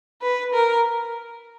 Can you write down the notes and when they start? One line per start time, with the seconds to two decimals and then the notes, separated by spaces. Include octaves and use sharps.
0.22 B4
0.53 A#4